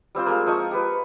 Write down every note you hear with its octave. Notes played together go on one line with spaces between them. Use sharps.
G3 C4 F4 C5
G#3 A#3
F3 D#5 C#6
G4 B4